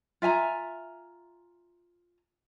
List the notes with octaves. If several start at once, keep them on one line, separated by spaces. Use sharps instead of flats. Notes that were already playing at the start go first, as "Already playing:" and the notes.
F4 E5 G#5 A#5